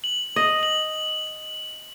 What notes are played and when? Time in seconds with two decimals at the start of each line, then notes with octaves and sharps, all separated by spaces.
0.04 F#7
0.36 D#5
0.63 F#7